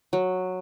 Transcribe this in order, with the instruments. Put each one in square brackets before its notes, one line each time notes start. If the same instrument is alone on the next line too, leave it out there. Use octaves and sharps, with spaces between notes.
[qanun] F#3